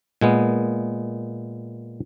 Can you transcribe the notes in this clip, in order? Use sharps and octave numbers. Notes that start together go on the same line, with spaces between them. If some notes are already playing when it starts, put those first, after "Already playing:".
A#2 G#3 B3